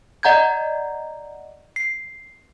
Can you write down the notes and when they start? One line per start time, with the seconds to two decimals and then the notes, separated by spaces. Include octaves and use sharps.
0.23 D5 D#5 F#5 A#5 G6 G#6
1.76 C7